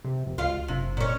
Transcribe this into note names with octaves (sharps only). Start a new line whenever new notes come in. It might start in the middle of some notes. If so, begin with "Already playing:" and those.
C3
F1
C#2 F4 F5
F#1 C3
A#2 C#4